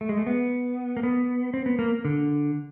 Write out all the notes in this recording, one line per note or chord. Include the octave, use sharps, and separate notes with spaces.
A3
G#3
A3
B3
A#3
B3
C4
B3
A#3
D3